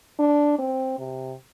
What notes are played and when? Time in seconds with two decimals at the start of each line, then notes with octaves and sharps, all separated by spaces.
0.19 D4
0.59 C4
0.98 C3